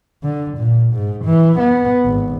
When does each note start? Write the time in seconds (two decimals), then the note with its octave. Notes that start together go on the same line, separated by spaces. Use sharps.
0.23 D3
0.58 A#2
0.94 G#2
1.25 E3
1.59 B3
2.05 G#1